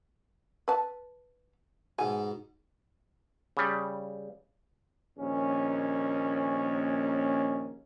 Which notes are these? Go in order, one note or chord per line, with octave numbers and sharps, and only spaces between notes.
B4 A5
G#2 B2 G#5
C#3 G3
A#1 D#2 C#4